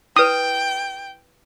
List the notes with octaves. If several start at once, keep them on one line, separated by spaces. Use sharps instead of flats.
E4 B4 G5 D#6